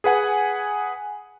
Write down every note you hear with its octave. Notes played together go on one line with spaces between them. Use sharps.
G#4 B4 F#5 G#5